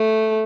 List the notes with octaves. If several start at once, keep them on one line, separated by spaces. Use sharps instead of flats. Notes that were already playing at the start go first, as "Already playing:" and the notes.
Already playing: A3